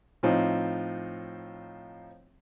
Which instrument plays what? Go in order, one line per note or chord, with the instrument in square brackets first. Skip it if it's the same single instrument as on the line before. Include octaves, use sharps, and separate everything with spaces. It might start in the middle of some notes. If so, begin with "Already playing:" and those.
[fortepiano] A2 F3 C4 D#4